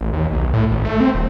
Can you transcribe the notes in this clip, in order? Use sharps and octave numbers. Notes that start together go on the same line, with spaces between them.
A1
D#2
B1
A2
G#1
A3
C4
D#1